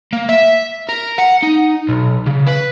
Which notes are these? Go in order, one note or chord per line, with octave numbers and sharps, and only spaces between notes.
A#3
E5
A#4
F#5
D#4
B1
C#3
B4